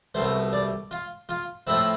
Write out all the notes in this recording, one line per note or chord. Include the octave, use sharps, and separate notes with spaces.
C2 B2 A3 C5
D5
F4
F4
A2 F3 A3 C4 E4